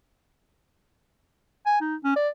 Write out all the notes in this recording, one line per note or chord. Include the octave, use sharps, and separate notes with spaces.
G#5
D#4
C#4
D5